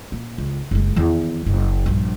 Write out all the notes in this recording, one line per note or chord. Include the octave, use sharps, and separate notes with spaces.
A#2
C#2
F#1 G#3
E2 D#3
F#1
A#1 G2